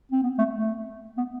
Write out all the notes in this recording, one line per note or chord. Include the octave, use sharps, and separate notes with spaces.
C4
B3
A3
A3
B3